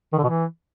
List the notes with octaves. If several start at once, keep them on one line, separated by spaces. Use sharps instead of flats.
D#3
D3
B2
E3